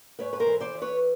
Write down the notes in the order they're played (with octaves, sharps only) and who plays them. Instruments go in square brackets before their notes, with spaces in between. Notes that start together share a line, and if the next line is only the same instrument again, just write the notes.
[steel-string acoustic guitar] G#2 B4 C#5
B4
A#4 C5
E3
C5 D5
E3
B4 C#5